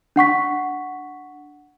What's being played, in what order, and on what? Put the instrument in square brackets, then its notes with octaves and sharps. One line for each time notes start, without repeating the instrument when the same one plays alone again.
[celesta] D4 F#5 C#6 B6